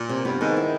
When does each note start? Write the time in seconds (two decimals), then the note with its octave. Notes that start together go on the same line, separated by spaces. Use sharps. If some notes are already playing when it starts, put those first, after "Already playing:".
Already playing: A#2
0.09 C3
0.25 G2 B3
0.41 G#2 D#3
0.57 E4